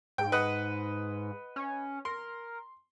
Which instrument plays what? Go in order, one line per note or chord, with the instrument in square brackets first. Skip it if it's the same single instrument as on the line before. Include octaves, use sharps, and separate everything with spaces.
[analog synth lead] G#2 [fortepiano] G5
[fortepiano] B4 D#5 F#5
[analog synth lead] C#4
[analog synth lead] A#4 [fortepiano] C6